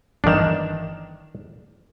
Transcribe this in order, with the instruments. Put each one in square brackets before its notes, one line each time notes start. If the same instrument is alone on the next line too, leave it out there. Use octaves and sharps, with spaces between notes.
[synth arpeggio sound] G1 E3 E7 [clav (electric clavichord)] D#3 D4